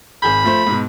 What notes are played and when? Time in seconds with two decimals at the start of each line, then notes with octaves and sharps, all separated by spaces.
0.22 G#1 G#4 B5 G6
0.44 F3 A3 C5
0.67 G#2 B2